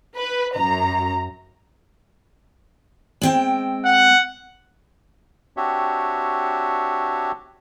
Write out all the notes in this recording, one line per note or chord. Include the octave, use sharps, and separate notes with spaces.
B4
F#2 A#5
G#3 C4 G5
F#5
C4 D4 F#4 G4 C#5 E5